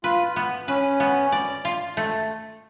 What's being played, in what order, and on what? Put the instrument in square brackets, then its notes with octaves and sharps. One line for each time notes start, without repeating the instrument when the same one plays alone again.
[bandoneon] F4 [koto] B4
[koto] B3
[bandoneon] C#4 [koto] B4
[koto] B3
D5
F4
A3